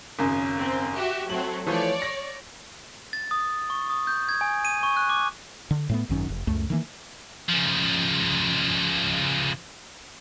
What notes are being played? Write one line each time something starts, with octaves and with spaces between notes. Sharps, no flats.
G#1 F#2 C#3
C4
F#4 G4 E5
F#3 A3 C4 F#7
E3 F3 A3 C#5 D5
A#6
A6
D#6
C#6
D#6
G6
G#6
G#5
D#7
C#6
F#6
D6
D3
A2 A3 B3
G#1 F#2 D#3 C#4
F1
C#2 F#2 A3
D#3 E3 A#3
C#3 F3